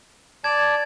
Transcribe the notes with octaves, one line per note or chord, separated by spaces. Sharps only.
D5 A5 G#6